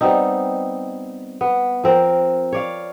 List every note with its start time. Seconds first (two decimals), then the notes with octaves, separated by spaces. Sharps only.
0.01 G3 B3 C4 D#4
1.41 B3
1.84 F3 C4 A#4
2.53 C#5 D5 F5